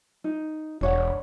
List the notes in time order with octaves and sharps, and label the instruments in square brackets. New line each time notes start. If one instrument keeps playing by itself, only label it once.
[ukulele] D#4
[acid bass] E1 [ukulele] D4 C#5 F#5